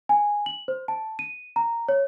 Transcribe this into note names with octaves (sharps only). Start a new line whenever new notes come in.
G#5
F#7
C5
A5
D#7
A#5
C#5